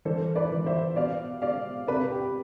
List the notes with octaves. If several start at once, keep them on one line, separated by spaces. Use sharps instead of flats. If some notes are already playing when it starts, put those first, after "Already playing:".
E3 A4 C5
B4 D5
E3
C5 E5
B2 D5 F5
B2 D5 F5
C3 B4 D5
G4